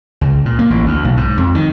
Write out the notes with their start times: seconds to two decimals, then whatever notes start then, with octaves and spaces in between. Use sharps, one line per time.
0.21 C#2
0.45 A#2
0.59 A#3
0.70 A1
0.86 D2
1.04 B1
1.17 G#2
1.38 F2
1.55 D#3